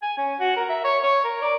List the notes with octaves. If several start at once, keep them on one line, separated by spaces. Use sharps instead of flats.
G#5
C#4
F#4
A#4
E5
C#5
C#5
A#4
D5